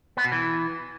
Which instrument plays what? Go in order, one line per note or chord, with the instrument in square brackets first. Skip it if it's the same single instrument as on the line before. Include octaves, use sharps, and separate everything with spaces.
[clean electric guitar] B3
B2
E3